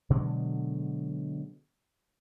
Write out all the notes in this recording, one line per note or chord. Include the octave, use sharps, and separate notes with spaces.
B2 D3 F#3 G#3